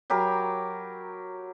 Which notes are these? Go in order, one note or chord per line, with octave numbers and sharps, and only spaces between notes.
F#3 G4 A#4 B5